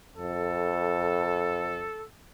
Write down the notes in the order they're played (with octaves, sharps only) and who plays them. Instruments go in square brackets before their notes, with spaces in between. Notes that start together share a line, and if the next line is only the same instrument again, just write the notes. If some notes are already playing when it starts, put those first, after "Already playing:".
[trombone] F2 [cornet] A4